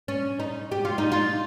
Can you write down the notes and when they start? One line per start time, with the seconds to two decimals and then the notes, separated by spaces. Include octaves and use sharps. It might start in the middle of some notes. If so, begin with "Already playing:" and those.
0.08 C#4
0.40 D#4
0.72 G4
0.85 F4
0.98 D#4
1.12 F4